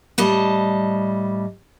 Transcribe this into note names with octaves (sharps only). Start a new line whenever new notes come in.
A2 G3 D#5 A5